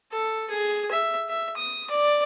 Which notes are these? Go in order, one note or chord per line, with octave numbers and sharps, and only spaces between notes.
A4
G#4
E5
E5
D#6
D5